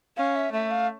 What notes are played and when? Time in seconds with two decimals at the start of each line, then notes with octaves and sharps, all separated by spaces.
0.17 C#4 F5
0.35 E5
0.52 A3 E5
0.71 F5